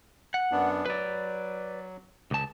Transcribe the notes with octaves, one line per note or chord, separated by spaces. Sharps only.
F#5
F#2 B3 D4
F#3 B4 D5
C#2 A5